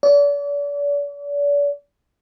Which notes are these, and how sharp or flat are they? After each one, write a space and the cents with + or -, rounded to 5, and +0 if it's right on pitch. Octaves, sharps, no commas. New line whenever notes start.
D5 -40